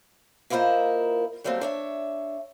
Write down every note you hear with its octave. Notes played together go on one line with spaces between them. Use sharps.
A#3 E4 F4 A#4 C5 D#5
F#3 G3 A3 A#3 C4
D4 C#5 E5